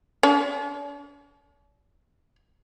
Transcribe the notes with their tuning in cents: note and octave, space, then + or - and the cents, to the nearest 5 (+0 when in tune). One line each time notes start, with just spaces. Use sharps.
D4 -45